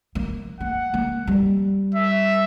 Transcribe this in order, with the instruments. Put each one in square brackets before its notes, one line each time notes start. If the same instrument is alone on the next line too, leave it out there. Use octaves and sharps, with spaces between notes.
[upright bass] A#3
[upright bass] A#3 [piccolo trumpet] F#5
[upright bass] A#3
G3
[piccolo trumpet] E5